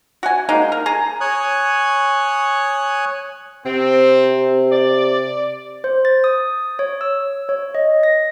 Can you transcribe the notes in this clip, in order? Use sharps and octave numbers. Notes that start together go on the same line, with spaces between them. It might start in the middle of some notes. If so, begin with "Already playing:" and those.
F#4 F#5 G#5
G#3 A#3 D#4
A#4
G#4 G#5 A#5
C#5 G#5 D#6 F#6
C3 C4
D5
C5
A6
D#6
C#5
E6
C#5
D#5
A#6